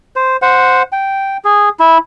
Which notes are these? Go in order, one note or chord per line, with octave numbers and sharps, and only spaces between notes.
C5
C5 F#5
G5
G#4
E4